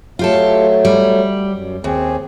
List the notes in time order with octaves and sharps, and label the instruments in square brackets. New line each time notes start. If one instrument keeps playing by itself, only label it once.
[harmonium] F#3 A3 [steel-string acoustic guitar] F4 G4 A4
[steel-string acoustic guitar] G3
[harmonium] F#2
[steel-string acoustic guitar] D#2 [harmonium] C4 G#4